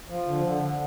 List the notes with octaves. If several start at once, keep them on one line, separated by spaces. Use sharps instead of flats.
F3
D3
D3
D3